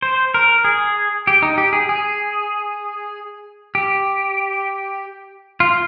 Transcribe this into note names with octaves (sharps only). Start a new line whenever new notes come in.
C5
A#4
G#4
G4
D#4
G4
G#4
G#4
G4
F4